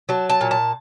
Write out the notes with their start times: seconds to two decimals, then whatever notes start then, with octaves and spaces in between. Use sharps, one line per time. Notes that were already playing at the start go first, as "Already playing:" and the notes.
0.09 F#3 A5
0.29 A5
0.41 A#2
0.51 A5